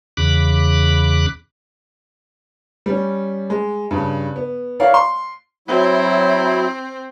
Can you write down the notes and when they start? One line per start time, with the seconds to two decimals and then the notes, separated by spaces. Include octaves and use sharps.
0.17 E2 C#3 B5 D6 F#6
2.86 G3 C#4
3.50 G#3
3.91 G2 C#3
4.36 B3
4.80 E4 A#4 C#5 D5 F5 F#5
4.94 C6
5.68 F#3 C4 E4